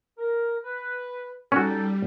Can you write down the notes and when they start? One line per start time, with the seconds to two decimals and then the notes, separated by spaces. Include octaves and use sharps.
0.18 A#4
0.63 B4
1.52 G3 C#4 D#4 F#4 A4